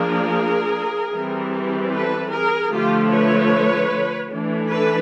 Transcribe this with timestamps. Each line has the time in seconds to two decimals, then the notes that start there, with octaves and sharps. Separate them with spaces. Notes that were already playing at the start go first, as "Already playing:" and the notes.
Already playing: F3 A#3 D4 G#4 A#4
1.12 E3 G3 C4
1.92 A4 B4
2.32 G#4 A#4
2.71 D3 F3 A3 F4 G4
3.11 B4 C#5
4.32 E3 A3 D4
4.70 A4 B4